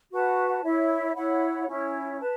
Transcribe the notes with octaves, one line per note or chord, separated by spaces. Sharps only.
F#4 B4 F#5 A5
E4 C#5 E5
E4 C#5 F#5 B5
C#4 E4 C#5
B4 A5